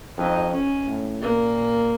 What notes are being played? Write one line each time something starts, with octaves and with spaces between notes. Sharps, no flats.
F2 D#4
C#4
A2
A#2 A#3